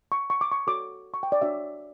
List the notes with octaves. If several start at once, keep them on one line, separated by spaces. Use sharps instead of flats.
C#6
C#6
D6
C#6
F#4 A4 C#5 D6
C#6
G5
D5
D4 F#4 C#5 E5